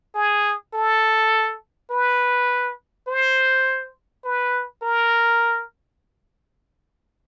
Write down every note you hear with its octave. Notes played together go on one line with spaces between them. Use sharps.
G#4
A4
B4
C5
B4
A#4